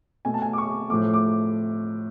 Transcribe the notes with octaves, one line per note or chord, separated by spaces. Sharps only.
B2 A3 G#5
A5
G#5
D6
C#6
A2 F3 A3 D6
D6